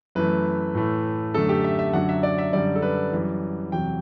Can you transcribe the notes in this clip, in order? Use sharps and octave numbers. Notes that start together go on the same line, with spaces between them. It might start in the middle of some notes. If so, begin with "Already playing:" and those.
F#2 E3 A3 B4
A2 E3 A3
F#2 D3 A3 A4
G4
E5
E5
F#2 D3 F#3 F#5
E5
D5
E5
F#2 D3 G3 D5
A4
B4
F#2 E3 G3
E2 C3 F#3 G5